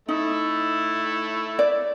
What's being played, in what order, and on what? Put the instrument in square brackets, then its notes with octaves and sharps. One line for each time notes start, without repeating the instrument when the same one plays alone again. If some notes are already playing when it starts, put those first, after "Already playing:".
[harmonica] A3 E4 [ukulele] D#4
[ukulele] D5